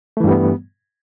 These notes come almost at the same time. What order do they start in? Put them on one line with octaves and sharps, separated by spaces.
A3 E3 G2 G3 B3